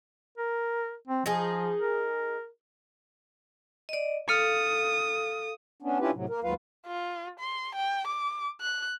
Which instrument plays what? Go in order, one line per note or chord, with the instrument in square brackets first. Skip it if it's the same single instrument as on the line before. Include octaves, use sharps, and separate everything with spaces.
[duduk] A#4
C4
[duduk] F3 [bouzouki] D#4 G#4
[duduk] A#4
[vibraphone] D5 D#5
[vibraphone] A4 F5 [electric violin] D#6 [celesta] F6 C#7
[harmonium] B3 C#4 D4
C#4 D4 E4 F4 G4 B4
A2 C3 F#3
A#3 A#4
D#2 G#2 F#3 F4 B4 F5
[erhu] F4
C6
G5
D6
F#6